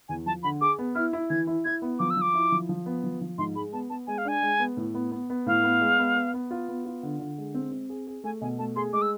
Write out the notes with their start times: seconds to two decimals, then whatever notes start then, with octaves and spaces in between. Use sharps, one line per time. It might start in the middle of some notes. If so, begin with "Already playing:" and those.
0.09 E2 G#5
0.26 F3 A5
0.43 D3 B5
0.61 G#4 D6
0.79 B3
0.95 E4 F6
1.13 E4
1.30 E3 G#6
1.47 E4
1.65 E4 G#6
1.82 B3
1.99 F3 D6
2.10 E6
2.17 F3 D6
2.34 E4
2.52 F3
2.69 F3
2.86 B3
3.04 F3
3.21 F3
3.38 G#2 C6
3.55 G#3 B5
3.73 B3 A5
3.90 B3 A5
4.07 G#3 G#5
4.18 F5
4.25 D4 G#5
4.42 G#3
4.59 B3
4.77 A2
4.95 B3
5.12 B3
5.30 B3
5.46 A2 F5
5.64 B3
5.81 G#3
5.99 B3
6.15 B3
6.34 B3
6.51 F4
6.68 B3
6.85 F4
7.03 D3
7.20 D3
7.38 G#3
7.54 C4
7.72 C4
7.89 G#4
8.07 G#4
8.24 A3 G#5
8.41 B2 G#5
8.59 A3 A5
8.76 G#4 C6
8.93 G#3 D6
9.02 E6